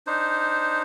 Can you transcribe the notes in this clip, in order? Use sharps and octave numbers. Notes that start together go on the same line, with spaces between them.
D4 D#4 C5